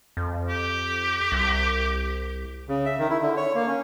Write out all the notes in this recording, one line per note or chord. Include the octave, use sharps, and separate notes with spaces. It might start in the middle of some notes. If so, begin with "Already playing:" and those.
F2
G4
C2
C#3
E5
D#3
E4
D3
C#5
A#3
C#4